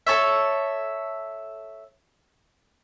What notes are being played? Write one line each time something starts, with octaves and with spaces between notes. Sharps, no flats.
A4 C#5 E5